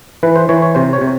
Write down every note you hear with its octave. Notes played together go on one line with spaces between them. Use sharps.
E3 B4
C5
E3 C#5
C#5
C3 C5
C#5
C3